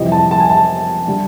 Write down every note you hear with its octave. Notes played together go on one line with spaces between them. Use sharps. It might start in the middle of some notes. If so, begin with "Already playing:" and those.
Already playing: F2 C3 E3 G3 D#5
A5
A5
G#5
A5
D3 G3